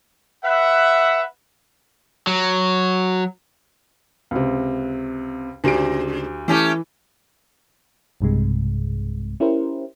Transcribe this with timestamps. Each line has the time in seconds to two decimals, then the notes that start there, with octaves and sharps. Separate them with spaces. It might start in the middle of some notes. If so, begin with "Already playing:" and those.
0.44 B4 E5 F#5
2.27 F#3
4.31 C#2 C3
5.64 D2 G#2 C#3 G4 D7
6.48 E3 A3 C#4 G4
8.21 B1 G2 C3 G#3
9.40 C#4 E4 G4 A#4 C5